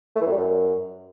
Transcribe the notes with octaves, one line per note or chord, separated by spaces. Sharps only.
A3
E3
F#2
G3
F#2